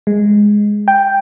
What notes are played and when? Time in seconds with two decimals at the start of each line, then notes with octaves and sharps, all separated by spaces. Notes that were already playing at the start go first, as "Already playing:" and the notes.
0.07 G#3
0.88 G5